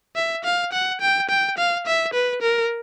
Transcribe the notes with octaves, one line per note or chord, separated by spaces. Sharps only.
E5
F5
F#5
G5
G5
F5
E5
B4
A#4